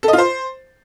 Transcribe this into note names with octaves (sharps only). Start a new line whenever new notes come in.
A4
D#5
F4
C5